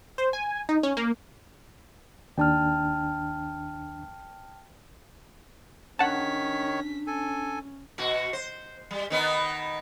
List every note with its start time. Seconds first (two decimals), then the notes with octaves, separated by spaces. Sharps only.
0.18 C5
0.33 G#5
0.69 D#4
0.83 C#4
0.97 A#3
2.38 D#2 D4 G5 A5 F6
5.99 D#3 C#4 D4 C#5 F#5 A5 B6
7.07 C#4 A4 G#5
7.98 B2 F#4
8.33 C5
8.91 G3
9.10 D#3 B3 D#4